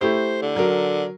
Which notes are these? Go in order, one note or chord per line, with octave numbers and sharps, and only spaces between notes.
A3 E4 G4 C5
D3
F#3 A#4